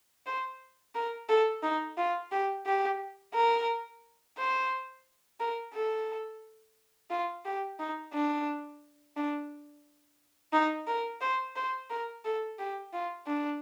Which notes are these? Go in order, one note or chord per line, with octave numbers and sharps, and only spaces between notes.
C5
A#4
A4
D#4
F4
G4
G4
A#4
C5
A#4
A4
F4
G4
D#4
D4
D4
D#4
A#4
C5
C5
A#4
A4
G4
F4
D4